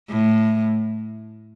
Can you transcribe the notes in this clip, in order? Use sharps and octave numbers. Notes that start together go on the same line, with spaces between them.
A2